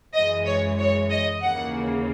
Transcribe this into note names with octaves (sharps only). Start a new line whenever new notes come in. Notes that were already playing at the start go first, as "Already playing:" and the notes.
F#2 E3 G#3 D#5
C#5
C#5
D#5
D#2 C#3 E3 A#3 F#5